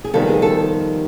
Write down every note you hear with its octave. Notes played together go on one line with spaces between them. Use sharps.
G#4
F2 C3 D#3 G3 B3 A4
G#4
A4